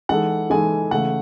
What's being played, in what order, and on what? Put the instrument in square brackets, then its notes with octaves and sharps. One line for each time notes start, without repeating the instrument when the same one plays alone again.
[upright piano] E3 G#3 D#4 A4 [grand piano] F#5
[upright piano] E3 G#3 D#4 A4 [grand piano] G#5
[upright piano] C#3 E3 A3 [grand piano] F#5